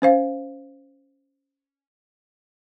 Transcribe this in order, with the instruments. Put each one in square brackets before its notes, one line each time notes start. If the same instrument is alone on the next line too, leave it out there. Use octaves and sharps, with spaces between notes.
[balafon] C#4 C5 F5